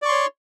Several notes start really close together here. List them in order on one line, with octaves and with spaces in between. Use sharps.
D5 C#6 C6 C#5